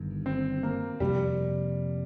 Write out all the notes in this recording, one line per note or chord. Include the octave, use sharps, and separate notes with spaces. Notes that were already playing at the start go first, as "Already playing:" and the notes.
Already playing: G1 G2 D#3
C4
A#3
F2 C3 F3 G3 A#3